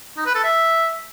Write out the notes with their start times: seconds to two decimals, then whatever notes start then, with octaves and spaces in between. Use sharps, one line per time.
0.17 D#4
0.26 B4
0.35 A4
0.44 E5